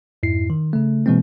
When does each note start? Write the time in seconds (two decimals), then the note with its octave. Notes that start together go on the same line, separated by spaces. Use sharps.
0.23 F2 G#2 E4 C7
0.50 D#3
0.73 C#3 A3
1.06 B2 E3 G#3 A#3 C4